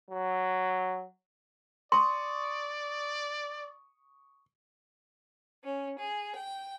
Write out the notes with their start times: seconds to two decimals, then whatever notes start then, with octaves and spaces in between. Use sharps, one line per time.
0.10 F#3
1.92 D5 C6 C#6 D#6
5.64 C#4
5.99 G#4
6.36 G5